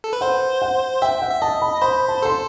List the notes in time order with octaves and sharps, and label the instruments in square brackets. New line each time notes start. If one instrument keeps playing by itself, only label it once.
[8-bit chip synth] A4
B4
[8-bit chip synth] C5 [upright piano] F#5
[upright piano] F#5
[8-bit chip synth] E5 [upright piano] G5
[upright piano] F#5
[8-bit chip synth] E5
[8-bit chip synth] D#5 [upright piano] A5
[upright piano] B5
[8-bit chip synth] C5 [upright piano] B5
[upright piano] A5
[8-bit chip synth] A4 [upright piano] C6